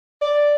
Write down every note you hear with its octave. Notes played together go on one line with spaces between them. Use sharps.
D5